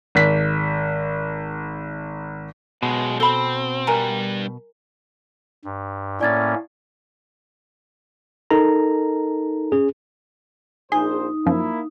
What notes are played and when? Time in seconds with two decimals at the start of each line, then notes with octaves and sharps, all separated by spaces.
0.15 G#1 B6
2.83 B1 B2 G#3
3.20 C4 A4 B5
3.87 G2 G3 A#4 G#5 A#5
5.65 G2
6.21 A2 A#3 C#4 D5 G#6 A6
8.51 D#4 A4 A#4 A#5
9.72 C#4 G#4
10.92 A#1 D#4 G#4 C5
11.46 F#2 F3 A#3 E4